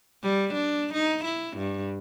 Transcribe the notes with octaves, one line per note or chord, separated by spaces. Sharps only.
G3
D4
D#4
E4
G2